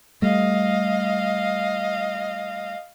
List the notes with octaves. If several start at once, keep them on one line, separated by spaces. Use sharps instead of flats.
G3 A3 D#5 F5